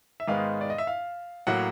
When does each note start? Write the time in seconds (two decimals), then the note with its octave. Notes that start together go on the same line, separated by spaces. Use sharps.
0.20 E5
0.28 G#2 D#3 G#3 B3 F5
0.61 D5
0.70 D#5
0.78 E5
0.87 F5
1.47 A2 F#3 A#3 F#5